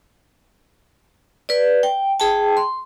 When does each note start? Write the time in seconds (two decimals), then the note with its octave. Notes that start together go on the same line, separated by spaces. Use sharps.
1.49 B4 D5
1.83 G5
2.20 G#4 G5 A5
2.57 C6